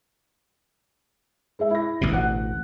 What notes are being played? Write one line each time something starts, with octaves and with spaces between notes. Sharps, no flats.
G#3 G#4 E5
E4 A#6
A1 D2 B2
F#5